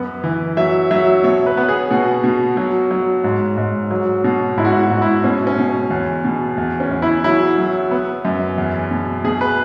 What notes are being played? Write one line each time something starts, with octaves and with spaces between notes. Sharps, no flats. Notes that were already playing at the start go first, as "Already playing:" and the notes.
Already playing: F#2 B3
E3
F#3 E5
F#3 E5
B2 C#5
B4
B3
G#4
B2 F#4
B2
F#3
F#3
G#2
G#2
F#3
B2
G#2 E4
F#4
E4
F#4
G#2
E4
B2 C#4
C#4
B2
E2
B2
E2
C#4
E2
E4
F#3 E4
F#3
B3
F#2
E2
B2
B2 G#4
B4